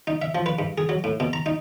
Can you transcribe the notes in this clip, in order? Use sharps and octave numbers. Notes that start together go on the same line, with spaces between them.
D#4
E5
F3
B4
G2
G#4
F#3
A2
B2
A#5
D#4